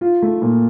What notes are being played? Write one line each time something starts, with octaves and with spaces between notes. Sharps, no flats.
F4
A3
A#2